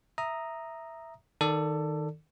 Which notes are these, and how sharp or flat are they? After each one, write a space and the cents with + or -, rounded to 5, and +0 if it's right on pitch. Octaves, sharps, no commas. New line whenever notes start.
E5 +0 A#5 +0 D#6 +0
D#3 +0 A4 +15 D5 +0